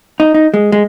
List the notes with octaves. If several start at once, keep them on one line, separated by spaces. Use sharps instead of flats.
D#4
D#4
G#3
G#3